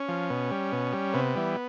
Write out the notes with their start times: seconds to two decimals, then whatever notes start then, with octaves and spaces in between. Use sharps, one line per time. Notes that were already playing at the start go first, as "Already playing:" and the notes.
Already playing: C#4
0.08 F3
0.30 B2
0.51 G3
0.72 B2
0.93 G3
1.14 C3 B3
1.35 E3 G3